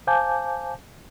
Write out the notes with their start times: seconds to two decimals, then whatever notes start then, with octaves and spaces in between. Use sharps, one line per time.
0.07 C5 F5 G#5 A5 D6 G6